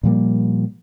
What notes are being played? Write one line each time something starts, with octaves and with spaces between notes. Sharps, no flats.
A#2 F3 G3 A#3